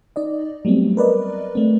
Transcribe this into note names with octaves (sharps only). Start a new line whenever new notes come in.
D#4 D5 D#5
F#3 G3 A3 B3 C4
A#4 B4 D5 D#5
A3 C4